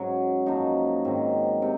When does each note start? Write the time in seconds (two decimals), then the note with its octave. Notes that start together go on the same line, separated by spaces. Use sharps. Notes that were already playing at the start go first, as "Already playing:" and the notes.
Already playing: G#2 F#3 C#4
0.46 F#2 F3 A#3 D#4
1.05 G#2 D#3 F#3 C4
1.62 C3